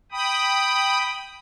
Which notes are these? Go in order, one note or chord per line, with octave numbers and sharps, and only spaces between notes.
G5 B5 D#6